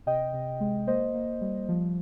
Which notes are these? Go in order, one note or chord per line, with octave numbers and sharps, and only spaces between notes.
C3 D#5 G5
C3
G#3
A#3 C5 D#5
A#3
G3
F3